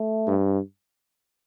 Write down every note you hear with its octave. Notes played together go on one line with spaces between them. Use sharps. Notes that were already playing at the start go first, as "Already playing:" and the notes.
Already playing: A3
G2